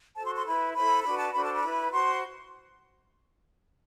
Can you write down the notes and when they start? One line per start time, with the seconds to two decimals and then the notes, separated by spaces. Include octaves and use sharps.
0.16 F#4 A4 C5 A5
0.25 C6
0.36 C6
0.45 E4 B4 B5
0.74 E4 A4 C5 B5
1.04 D4 F#4 B4 B5
1.18 A5
1.33 D4 F#4 A4 C5 B5
1.44 A5
1.54 B5
1.63 E4 B4
1.92 F#4 C5 C6